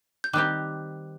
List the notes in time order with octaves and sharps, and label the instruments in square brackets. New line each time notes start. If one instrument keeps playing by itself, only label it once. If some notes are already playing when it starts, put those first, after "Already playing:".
[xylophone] G6
[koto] D#3 G3 C4 G4 [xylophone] D6 F#6